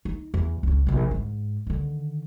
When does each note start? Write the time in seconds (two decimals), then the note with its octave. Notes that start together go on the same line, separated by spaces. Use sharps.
0.05 D#4
0.34 E2
0.63 C#2 C#4
0.87 A#1 C3
1.11 G#2
1.67 D3 D#3